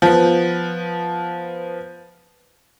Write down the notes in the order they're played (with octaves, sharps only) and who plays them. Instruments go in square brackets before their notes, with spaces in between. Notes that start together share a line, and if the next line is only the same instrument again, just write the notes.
[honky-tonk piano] F3 B3